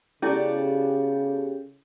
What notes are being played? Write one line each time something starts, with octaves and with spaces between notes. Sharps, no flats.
C#3 B3 C#4 E4 F#4 G4 A4 D5